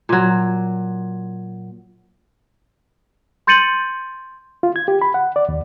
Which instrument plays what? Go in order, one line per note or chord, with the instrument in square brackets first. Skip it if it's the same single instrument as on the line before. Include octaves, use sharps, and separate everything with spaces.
[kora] A#2 F#3
[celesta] C6 G6 A6 C#7 D#7 F#7
[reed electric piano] F4
G#6
G4
B5
F#5
D5
D#2